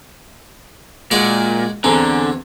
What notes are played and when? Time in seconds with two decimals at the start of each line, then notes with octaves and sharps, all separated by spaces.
1.11 A#2 G#3 F#4 D5
1.84 E2 D3 C4 A4 G#5 A#5